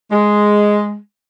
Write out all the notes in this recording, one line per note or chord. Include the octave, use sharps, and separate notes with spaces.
G#3